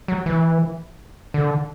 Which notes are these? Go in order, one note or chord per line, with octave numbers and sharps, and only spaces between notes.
F#3
E3
D3